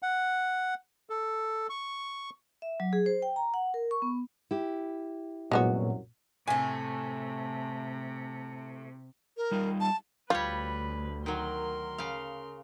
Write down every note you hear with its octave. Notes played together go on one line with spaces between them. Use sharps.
F#5
A4
C#6
E5
F#3
G#4
C5
G5
A#5
F#5
A#4
C#6
B3
E4 G4
C2 F#2 A#2 F#3 G#3 B3 F#4
A2 C3 A3 G#5
A#4
G3 D#4 F4
A5
D2 G3 F4 B4 C#5
D#3 F#3 A#4 C6
C#3 F5